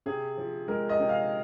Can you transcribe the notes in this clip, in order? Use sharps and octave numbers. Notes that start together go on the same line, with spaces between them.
C3 G#4
F3
G#3 A#4
D#5
C3
F5